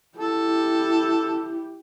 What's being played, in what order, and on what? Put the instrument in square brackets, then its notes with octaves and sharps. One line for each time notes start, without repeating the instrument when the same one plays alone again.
[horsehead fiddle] E4 G4 [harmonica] A4